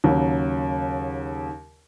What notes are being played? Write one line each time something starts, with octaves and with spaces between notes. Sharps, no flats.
D#2 C#3 F#3 C#4